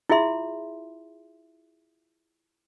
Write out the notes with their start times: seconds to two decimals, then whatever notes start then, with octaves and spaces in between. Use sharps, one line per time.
0.09 E4 F4 G#4 E5 C6